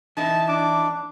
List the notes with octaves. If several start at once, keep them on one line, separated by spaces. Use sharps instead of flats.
E3 D#4 E4 A5
D4 D6